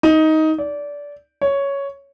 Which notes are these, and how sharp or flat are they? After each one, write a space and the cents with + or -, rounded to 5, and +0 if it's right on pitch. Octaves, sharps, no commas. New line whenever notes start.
D#4 +15
D5 -20
C#5 +5